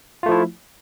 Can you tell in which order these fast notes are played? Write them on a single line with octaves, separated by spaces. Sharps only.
F4 A3 F3 E4